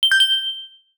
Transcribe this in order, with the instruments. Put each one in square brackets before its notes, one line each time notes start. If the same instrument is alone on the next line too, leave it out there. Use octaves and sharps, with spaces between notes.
[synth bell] G7
G6
G7